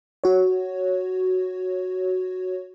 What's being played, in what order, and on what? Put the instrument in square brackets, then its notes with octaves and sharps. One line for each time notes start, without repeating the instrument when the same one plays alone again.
[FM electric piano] F#4 C#5